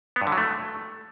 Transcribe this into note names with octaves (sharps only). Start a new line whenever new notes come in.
B3
G2
D3
F#3
A3